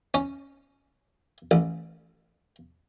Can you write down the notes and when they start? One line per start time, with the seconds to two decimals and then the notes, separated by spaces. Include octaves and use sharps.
0.14 C#4
1.51 A1